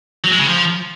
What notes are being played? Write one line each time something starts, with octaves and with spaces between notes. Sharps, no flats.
F#3
G#3
C#3
F3